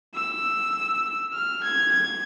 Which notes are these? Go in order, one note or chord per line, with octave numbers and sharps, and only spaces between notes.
E6
F6
G#6
G#6